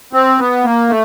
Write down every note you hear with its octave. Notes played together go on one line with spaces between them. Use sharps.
C4
B3
A#3
A3